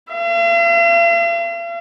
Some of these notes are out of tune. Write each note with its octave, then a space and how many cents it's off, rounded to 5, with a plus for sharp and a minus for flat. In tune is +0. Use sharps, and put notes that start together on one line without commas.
F5 -45